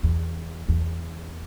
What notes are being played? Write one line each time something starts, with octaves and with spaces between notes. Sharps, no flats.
E2
E2